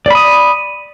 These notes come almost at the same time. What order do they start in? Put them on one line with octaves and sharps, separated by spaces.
D5 B5 D#6